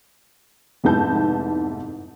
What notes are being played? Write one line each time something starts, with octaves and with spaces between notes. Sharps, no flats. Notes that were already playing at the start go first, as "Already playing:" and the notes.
F1 G#2 B3 E4 A5 G6